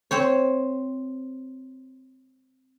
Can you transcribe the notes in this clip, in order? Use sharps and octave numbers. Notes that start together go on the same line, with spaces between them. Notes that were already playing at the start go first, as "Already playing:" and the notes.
C4 C5 C#5